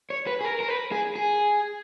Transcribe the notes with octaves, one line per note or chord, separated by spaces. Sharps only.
C#5
B4
G#4
A#4
A#4
B4
G#4
G#4